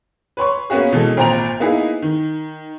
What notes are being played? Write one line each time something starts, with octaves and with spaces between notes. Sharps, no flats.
B4 C#5 C6 C#6
A#3 B3 C#4 F#4 G#4
B2 E3 G#3 A4
G#1 A#2 C5 G5 A#5 F7
A#3 B3 D#4 E4 G#4
D#3